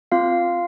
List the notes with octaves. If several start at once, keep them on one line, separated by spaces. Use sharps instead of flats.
C4 F4 F5